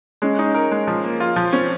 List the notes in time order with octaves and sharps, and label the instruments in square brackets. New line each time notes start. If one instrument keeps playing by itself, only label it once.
[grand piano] G#3 [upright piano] C#4
[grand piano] D#4
A#4
G#3
F3
A#3
F4
F3
[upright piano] C4 [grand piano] C#4